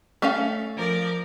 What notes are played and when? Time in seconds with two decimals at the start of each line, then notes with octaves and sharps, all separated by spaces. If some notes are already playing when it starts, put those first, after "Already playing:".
0.22 A3 C#4 F5
0.75 F3 A#4 D5